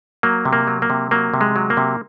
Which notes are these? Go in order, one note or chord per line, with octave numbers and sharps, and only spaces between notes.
F#3 A#3
C3
A#3
F#3
A#3
C3
F#3 A#3
C3
G#3
F#3
A#3
C3